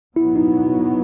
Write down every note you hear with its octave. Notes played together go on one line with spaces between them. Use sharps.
B2 F#3 B3 E4
D#4